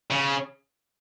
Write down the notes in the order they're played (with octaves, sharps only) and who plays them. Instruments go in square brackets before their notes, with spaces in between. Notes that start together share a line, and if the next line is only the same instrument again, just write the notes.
[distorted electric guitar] C#3